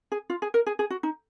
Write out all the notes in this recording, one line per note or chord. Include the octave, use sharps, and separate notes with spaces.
G#4
F4
G#4
A#4
G#4
G#4
F#4
D#4